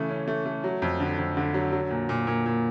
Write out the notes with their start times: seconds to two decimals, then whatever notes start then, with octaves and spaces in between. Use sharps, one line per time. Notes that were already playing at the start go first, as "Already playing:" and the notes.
Already playing: C#3 E3 A3
0.10 C#4
0.27 A3
0.46 A3
0.64 F#3
0.82 F2
1.00 D3
1.18 F2
1.37 D3
1.54 F#3
1.72 F#3
1.90 A#2
2.09 A#2
2.27 A#2
2.46 A#2